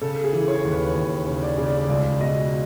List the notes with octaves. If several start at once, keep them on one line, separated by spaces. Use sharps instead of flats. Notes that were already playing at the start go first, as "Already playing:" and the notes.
C#3 A4
G#4
E3
C#5
D#2
B4
D#2
C#3
D5
C#3
D5
C#2 D5
B2 D#5